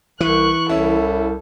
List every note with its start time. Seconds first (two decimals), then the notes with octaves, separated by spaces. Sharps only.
0.20 C2 E3 C#6 F#6
0.69 C2 C#4 E4 A4